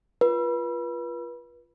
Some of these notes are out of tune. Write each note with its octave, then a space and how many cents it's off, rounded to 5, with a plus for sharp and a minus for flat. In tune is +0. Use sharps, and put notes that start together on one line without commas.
F4 -15 B4 -30